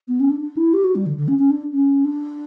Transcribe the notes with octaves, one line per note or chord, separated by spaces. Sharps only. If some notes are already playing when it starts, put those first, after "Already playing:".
B3
C#4
D4
D4
E4
G4
F#4
G3
D3
D3
C#4
C#4
D4
C#4
D4